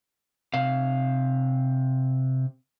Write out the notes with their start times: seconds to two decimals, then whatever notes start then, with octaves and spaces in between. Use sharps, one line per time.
0.54 C3 F5